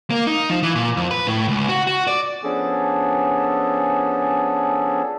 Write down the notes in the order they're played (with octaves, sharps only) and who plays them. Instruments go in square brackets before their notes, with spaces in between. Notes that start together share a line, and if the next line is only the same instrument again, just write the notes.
[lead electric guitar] A#3
D#4
F3
E3
A#2
F2
B4
A2
C#2
F#4
F#4
D5
[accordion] F3 B3 C#4 D4 G#4 A4